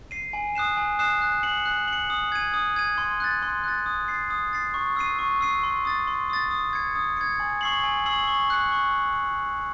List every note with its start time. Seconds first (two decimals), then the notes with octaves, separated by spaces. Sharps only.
0.11 C7 D#7
0.33 G#5
0.55 D#6 F#6 C7 E7
0.77 G#5
0.99 D#6 F#6 C7 E7
1.22 F#6
1.43 C#7 F#7
1.66 F#6
1.88 F#7
1.93 C#7
2.10 D#6
2.32 G#6 D#7
2.54 D#6
2.76 G#6 D#7
2.98 C6
3.20 F#6 A6
3.42 C6
3.64 F#6 A6
3.86 D#6
4.08 A6 C7
4.30 D#6
4.53 A6 C7
4.74 C#6
4.96 E6 C7 D#7
5.19 C#6
5.41 E6 C7 D#7
5.63 C6
5.85 D#6 A6
6.07 C6
6.30 D#6 A6
6.51 D#6
6.73 G#6 C#7
6.96 D#6
7.17 G#6 C#7
7.40 G#5
7.61 C#6 E6 C7 F#7
7.84 G#5
8.06 C#6 E6 C7 F#7
8.28 C#6
8.50 F#6 C#7
8.72 C#6